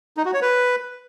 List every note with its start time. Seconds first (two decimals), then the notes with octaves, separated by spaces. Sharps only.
0.17 D#4
0.25 F#4
0.34 C#5
0.42 B4